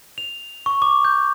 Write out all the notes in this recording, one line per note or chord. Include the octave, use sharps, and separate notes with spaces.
F7
C#6
D6
G6